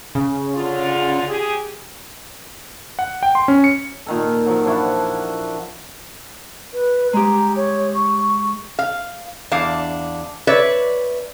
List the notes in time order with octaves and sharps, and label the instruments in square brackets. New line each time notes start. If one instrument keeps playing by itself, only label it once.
[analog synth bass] C#3
[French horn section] D3 F4
G4 G#4
[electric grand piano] F#5
G5
C6
C#4
C#7
[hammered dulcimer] A#2 D#3 A4
F3 F#3
F3 D4 E4 F#4
[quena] B4
[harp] G#3 G4 [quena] A#5
[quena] C#5
C#6
[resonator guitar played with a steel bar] F5
E2 D4 F5
B4 C#5 D5 E5